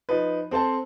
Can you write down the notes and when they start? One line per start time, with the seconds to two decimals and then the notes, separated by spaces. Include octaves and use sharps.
0.09 F3 D#4 B4
0.51 C4 A4 C5 A5